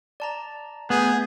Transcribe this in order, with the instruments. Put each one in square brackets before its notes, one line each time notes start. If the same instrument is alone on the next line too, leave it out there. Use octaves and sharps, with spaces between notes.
[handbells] D5 A5 A#5
[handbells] A3 G#5 G6 [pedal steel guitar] B3 [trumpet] G#4